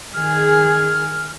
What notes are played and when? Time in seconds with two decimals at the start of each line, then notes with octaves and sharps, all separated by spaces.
0.14 D#3 G#4 F6